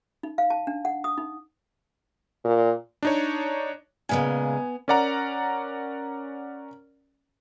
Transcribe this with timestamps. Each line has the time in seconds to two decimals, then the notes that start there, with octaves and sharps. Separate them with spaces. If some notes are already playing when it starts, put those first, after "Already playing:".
0.23 D#4
0.38 F5
0.50 A5
0.67 D4
0.85 F#5
1.04 D#6
1.18 D#4
2.44 A#2
3.03 D4 D#4 C#5
4.09 A#2 C#3 G#3 B3 G#5
4.88 C#4 A#4 D5 F#5 A#5